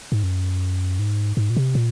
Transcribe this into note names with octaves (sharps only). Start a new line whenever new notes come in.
G#2
F#2
G#2
G#2
A#2
C3
A#2